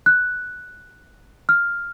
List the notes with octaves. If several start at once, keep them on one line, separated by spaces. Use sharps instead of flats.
F#6
F6